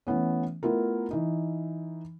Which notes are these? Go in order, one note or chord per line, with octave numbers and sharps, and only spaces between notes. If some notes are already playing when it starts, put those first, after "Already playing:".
E3 A3 B3 C#4
A3 B3 E4 F4 A#4
E3 D#4